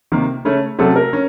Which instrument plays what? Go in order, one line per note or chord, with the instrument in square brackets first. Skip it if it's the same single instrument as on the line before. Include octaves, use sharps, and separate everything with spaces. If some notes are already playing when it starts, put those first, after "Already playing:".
[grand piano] C3 D#3 A#3
C#3 A3 C#4
[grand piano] C3 F#3 A3 C#4 [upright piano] A4
[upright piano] A#4
[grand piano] C#4